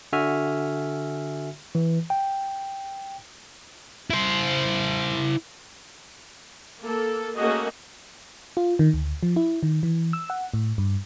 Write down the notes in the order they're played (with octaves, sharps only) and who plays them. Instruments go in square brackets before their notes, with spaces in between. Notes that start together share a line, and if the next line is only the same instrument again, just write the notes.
[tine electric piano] D3 F#4 E5 G#5 F6
E3
G5
[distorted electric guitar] E4 C5
[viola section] A#3 A4
A3 A#3 C#4 F#4 G#4 D#5
[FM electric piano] F4
D#3
D2
F3
E4
D#3
E3
E6
F#5
A2
G2